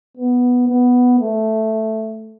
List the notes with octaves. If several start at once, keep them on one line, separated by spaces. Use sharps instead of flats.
B3
B3
A3